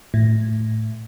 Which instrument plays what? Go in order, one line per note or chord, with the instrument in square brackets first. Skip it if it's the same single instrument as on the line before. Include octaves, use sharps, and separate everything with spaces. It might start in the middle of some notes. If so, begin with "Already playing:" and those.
[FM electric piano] A2